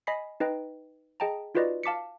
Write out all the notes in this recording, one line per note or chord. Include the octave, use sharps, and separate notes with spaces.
D#5 G#5 B5 B6 C7
D#4 B4 D#5 G5
G#4 D#5 G5 A5 A#5
D#4 F4 F#4 B4 D5 D#5
F5 A5 D6 B6 C#7